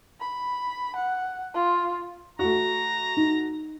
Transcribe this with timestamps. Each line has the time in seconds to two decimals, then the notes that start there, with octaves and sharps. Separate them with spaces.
0.20 B5
0.95 F#5
1.54 F4
2.39 A3 F#4 A#5
3.17 D#4